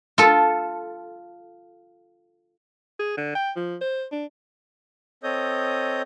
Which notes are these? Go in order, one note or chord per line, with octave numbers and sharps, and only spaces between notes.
F4 A4
G#4
D3
G5
F3
C5
D4
C4 A4 C#5 D#5 D#6 G6